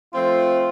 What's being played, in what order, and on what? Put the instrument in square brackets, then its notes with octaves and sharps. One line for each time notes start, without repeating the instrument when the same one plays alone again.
[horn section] F3 A3 C4 [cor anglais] F4